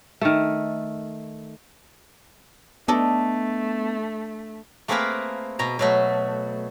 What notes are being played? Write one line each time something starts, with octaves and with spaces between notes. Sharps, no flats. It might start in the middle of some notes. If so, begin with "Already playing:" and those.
D#3 A3
A3 B3 D4 A4 D#5
A3 A#3 C4 G#4 B4 F5
B2 A#5
B2 F#3 A3